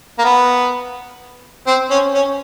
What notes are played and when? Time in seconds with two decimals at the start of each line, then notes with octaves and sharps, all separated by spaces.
0.19 A#3
0.24 B3
1.67 C4
1.91 C#4
2.14 C#4